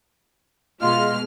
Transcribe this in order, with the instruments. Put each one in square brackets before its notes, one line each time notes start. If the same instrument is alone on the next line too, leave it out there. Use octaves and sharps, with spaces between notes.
[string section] B2 G#3 F6 [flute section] F4 D#5 C6